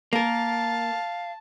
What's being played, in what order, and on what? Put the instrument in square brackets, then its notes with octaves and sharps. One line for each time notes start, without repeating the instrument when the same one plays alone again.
[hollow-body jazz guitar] A#3 A#4 [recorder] F5 [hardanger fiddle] A5